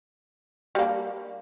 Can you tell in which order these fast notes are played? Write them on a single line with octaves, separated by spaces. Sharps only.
G3 A#3 D4